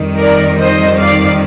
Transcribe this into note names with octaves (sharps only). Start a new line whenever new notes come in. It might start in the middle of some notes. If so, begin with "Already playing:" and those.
Already playing: F2 D#3 G3
A#4 D5
C5 D#5
D5 F5